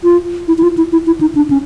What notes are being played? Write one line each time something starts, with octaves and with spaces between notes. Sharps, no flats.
F4
E4
E4
F4
E4
E4
E4
D#4
D4
C#4